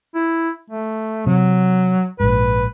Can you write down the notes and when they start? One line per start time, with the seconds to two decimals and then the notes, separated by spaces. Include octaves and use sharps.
0.15 E4
0.70 A3
1.26 C3 F#3
2.20 A#1 G#2 B4